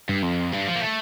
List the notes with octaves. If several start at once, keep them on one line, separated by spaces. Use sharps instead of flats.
G2
F2
G2
F3
A#3
A3